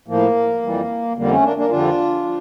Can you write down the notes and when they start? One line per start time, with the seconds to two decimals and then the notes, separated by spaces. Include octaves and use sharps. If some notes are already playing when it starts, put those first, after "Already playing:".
0.08 A2 F3 A#3
0.62 F2 E3 G3
1.16 F2 D3 G3 A#3
1.29 A3 C#4
1.43 A#3 D4
1.56 A#3 D4
1.70 F2 D3 G3 D4 F4
2.25 F3